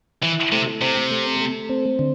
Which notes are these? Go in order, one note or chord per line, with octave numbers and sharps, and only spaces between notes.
E3 E4
C3 A3
C3 C4
A3
A3
C4
D3